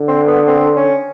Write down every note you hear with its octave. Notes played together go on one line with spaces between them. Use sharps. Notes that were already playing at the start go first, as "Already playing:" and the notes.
Already playing: D3
C4
B3
C4
C#4